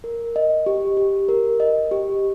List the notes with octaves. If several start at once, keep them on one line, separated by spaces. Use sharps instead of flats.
A#4
D#5
G4
G4
A#4
D#5
G4